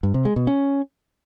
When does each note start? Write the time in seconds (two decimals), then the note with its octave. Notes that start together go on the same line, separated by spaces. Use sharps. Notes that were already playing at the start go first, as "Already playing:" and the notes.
0.03 G2
0.14 C3
0.25 G#3
0.36 B2
0.47 C#4